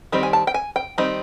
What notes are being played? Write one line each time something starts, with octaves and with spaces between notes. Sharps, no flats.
D#3 G3 C4 D#4
G#5
A5
G5
G#5
G5
D#3 G3 C4 D#4